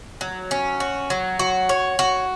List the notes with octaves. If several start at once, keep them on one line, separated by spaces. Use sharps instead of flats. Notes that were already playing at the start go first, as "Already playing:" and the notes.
F#3
C#4
F#4
F#3
F#4
C#5
F#4